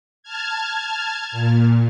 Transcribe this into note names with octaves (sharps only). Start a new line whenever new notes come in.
A5 F6 G#6
A#2